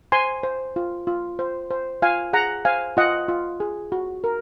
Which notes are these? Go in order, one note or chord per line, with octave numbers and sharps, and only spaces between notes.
C5 G#5 C6
C5
F4
F4
C5
C5
F4 F5 G#5
G#4 F#5 A#5
C5 F5 G#5
F4 D#5 F#5
F4
G#4
F#4
A#4